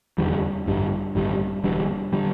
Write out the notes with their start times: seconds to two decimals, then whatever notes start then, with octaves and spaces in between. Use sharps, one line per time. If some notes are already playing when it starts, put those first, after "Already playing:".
0.18 F1 E2 D3 G3
0.66 A1 G2 D3 G3
1.15 A1 G2 D3 G3
1.64 E1 E2 D3 G3
2.13 D3 G3